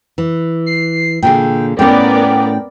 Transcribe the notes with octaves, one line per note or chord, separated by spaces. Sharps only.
E3
C7
A#2 D3 G#4 G5
A2 B3 C#4 A#4 D5 G5